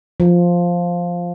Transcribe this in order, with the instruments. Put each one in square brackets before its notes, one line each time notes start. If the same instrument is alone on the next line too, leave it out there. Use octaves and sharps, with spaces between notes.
[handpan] F3